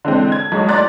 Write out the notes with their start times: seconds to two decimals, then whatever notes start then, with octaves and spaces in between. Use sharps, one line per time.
0.05 D3 E3 G#3 C4
0.32 G#6
0.52 B1 G#3 C#5
0.68 A2 D5 A#5 C6 F#6 A6